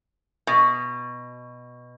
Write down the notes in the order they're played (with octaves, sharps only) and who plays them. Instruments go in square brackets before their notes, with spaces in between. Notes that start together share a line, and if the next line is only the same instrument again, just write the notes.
[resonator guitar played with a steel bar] B2